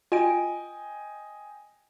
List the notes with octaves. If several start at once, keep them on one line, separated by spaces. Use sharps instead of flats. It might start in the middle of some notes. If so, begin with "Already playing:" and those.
F4 D#5 G5 G#5 D7